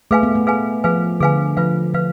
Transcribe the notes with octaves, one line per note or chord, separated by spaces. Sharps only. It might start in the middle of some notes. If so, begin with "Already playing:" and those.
A3 G#4 B4 F5 G#5
B3
A3
G#4 B4 F5 G#5
F3 G#4 B4 F5 G#5
D3 G#4 B4 F5 G#5
F3 F4 B4 F5
F3 B4 F5